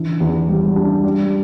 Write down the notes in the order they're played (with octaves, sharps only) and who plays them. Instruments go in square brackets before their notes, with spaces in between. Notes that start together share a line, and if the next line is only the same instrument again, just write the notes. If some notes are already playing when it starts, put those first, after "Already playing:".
Already playing: [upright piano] E3 D4
E2
G3
D4
G3